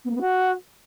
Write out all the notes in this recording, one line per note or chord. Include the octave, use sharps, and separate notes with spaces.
B3
A#3
B3
F#4